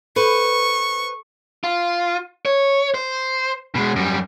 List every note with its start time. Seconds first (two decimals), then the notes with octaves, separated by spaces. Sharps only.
0.16 A4 B4 C5 C#6
1.64 F4
2.45 C#5
2.94 C5
3.75 B2 G#3
3.96 F#2 G3